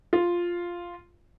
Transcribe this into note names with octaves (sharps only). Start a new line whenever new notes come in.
F4